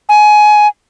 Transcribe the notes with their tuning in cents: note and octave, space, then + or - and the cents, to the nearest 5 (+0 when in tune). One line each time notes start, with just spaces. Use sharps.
G#5 +20